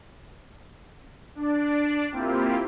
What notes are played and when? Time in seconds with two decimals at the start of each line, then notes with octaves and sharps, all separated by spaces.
1.35 D4 D5
2.11 A#3 C4 E4 F4 G4